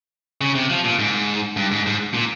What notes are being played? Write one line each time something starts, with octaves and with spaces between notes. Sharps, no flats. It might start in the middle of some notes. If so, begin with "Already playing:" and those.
C#3
C3
F3
A#2
G#2
G2
G#2
G#2
A#2